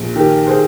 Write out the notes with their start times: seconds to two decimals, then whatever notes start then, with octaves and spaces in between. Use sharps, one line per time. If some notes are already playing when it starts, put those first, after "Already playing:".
Already playing: A#1
0.16 D#3 G4 A#4
0.47 G#4 C5